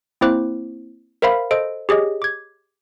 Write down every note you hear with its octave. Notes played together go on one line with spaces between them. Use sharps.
A#3 C4 E4 C5 D6 F#6
A#4 C5 E5 F5 B5
A4 C5 D#5 D7
G4 G#4 C#5 D#5
D6 G#6